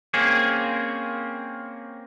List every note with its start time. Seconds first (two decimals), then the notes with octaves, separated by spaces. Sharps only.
0.14 A#3 C4 C#4 G#4